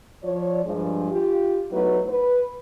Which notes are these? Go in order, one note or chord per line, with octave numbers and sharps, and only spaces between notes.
F3 C#5 D5
G2 F3 G#3
F4 G4
F#3 A3 B3 D#4 E4 B4
B4